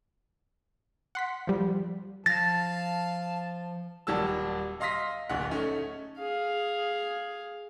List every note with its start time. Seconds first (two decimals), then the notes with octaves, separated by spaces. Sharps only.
1.15 F#5 C6 B6
1.47 F3 G3
2.26 F3 F5 A5 A6 A#6
4.07 D#1 F#3 G3 A5 E6
4.80 D#5 F5 C6 D#6 A#6 B6
5.29 D1 A#1 F#5
5.50 A3 C#4 D#4
6.19 G#4 F5